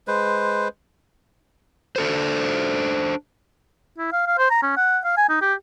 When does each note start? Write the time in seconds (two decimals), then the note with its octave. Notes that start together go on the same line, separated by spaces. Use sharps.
0.08 G#3 B4 C5
1.96 D4 A4 C5
3.98 E4
4.12 F5
4.27 F5
4.38 C5
4.50 A#5
4.62 C#4
4.77 F#5
5.04 F5
5.17 G#5
5.29 D#4
5.41 G4